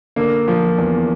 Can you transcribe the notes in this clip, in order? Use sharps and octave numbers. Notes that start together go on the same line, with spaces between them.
D3 A#3
F3
E2